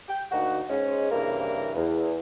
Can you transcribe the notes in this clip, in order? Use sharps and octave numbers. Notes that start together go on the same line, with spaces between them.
G5
D2 A#3 D#4 F#4
G#2 G#3 C#4
C2 G2 C#3 E3 A#3 A#4
E2